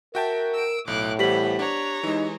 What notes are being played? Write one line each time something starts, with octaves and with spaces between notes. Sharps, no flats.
F#4 A#4 E5 G5 A5
E6 D7
B1 A2 D6 F#6
E3 G3 B3 G4 C5 B6 F#7
D4 C#5 A#5
E3 G#3 D#4